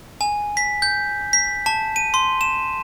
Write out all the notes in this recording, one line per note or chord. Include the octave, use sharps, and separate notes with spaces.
G#5
B6
G6
B6
A5
D#7
C6
E7